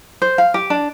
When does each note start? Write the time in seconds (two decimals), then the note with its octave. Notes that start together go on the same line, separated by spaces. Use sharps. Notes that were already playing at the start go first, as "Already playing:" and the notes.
0.22 C5
0.38 F5
0.54 G4
0.70 D4